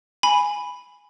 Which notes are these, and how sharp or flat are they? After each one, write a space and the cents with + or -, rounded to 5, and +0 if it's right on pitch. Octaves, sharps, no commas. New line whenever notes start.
G#5 +0 B5 +0